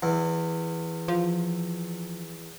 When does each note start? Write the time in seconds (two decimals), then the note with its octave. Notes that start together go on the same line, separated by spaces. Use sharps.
0.03 E2
1.08 F3